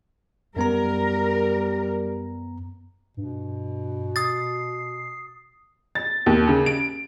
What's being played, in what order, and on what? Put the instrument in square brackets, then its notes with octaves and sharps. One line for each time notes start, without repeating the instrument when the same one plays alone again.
[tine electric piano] F#2 B3 A#5 [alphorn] G3 [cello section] A#4
[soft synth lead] G2 [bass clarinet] B2
[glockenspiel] D#6 A6 [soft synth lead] C7
[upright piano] A6
D#2
C#3
D7